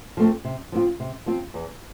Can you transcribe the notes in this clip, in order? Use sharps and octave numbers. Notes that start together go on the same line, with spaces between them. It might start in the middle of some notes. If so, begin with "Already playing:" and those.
F3 A3 C4
C3
F3 C4 F4
C3
F3 C4 F4
E2